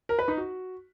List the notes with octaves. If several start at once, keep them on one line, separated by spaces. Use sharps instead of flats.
A#4
B4
D#4
F#4